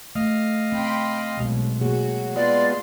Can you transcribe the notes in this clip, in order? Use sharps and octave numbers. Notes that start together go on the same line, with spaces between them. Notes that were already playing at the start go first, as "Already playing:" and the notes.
A3 D#5 F5
C4 G5 B5 C6
B1 G#3
F#3 A#3 F#4 G#4
G#3 B3 F4 D5 C6